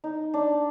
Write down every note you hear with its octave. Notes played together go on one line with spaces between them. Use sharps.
D#4
D4